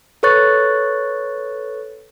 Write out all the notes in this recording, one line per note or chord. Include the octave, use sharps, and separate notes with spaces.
A4 B4 C#5 C#6 F#6 A6